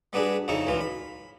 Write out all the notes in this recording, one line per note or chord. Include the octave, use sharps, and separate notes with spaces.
G3 B3 D4 F#4 G#4
F2 C#3 D#4 E4 C#6
C#2 F#2 A#2 E3 F4
B5